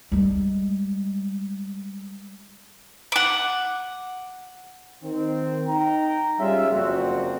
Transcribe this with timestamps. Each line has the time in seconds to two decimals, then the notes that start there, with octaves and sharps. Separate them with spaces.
0.12 G3 G#3
3.12 F#5 D6
5.03 D#3 C4
5.67 D#4 G5 A#5
6.39 G3 G#3 C#4 F4 E5
6.70 F#1 F2 A#2 F#3 C4 F#4